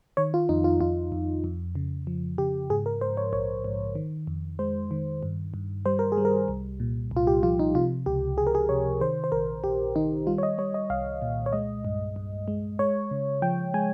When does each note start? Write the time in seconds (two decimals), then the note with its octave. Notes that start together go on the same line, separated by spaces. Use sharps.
0.17 D#3 C#5
0.34 F4
0.49 F2 D#4
0.64 F4
0.81 F2 F4
1.12 F2
1.44 F2
1.75 C#3
2.07 F3
2.38 C#3 G4
2.70 G#2 G#4
2.86 A#4
3.01 G#2 C5
3.17 C#5
3.33 A#1 C#5
3.64 G#2
3.95 D#3
4.27 F2
4.59 G#3 C5
4.91 D#3
5.23 G2
5.54 G2
5.86 G3 C5
5.99 A#4
6.12 G#4
6.17 G3
6.25 A#4
6.48 C2
6.80 A#2
7.11 C2
7.17 F4
7.27 G4
7.43 F3 F4
7.59 D#4
7.75 C3 F4
8.06 C#2 G4
8.38 C#2 G#4
8.47 A#4
8.55 G#4
8.69 C3 C#5
9.01 D#3 C5
9.24 C5
9.32 A#1 A#4
9.64 A#1 G4
9.96 D#3 D#4
10.27 G3 F4
10.38 C#5
10.43 D#5
10.58 G3 C#5
10.74 D#5
10.90 C2 F5
11.22 A#2
11.46 C#5
11.53 G#3 D#5
11.85 G2
12.16 G2
12.48 G#3
12.79 G#3 C#5
13.11 C#3
13.42 F3 G5
13.74 G#3 G#5